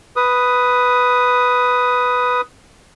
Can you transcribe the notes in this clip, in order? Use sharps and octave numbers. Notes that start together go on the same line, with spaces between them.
B4 D#6